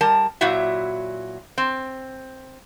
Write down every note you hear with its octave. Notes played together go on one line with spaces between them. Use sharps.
G3 A#4 A5
A#2 F#3 E4 F#4 E5
C4